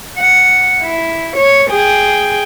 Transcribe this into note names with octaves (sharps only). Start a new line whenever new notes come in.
F#5
E4
C#5
G#4 G5